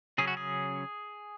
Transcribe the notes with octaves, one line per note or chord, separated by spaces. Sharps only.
C#3 F#3 C#4 G#4
F#4
G#4